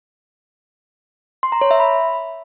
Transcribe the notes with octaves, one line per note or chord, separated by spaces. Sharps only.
C6
A#5
C#5
E5
B5